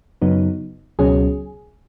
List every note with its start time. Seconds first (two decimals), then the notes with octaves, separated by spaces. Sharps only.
0.22 F#2 C#3 F#3 B3 D#4
0.99 C#2 B2 F#3 C#4 G#4